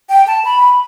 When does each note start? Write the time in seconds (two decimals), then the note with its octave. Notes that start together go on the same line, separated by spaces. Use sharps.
0.09 G5
0.27 A5
0.45 B5